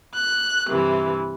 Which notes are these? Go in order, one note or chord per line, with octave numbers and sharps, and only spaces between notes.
F#6
G2 C3 E3